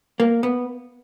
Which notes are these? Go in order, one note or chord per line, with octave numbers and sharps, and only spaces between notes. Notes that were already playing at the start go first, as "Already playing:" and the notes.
A#3
B3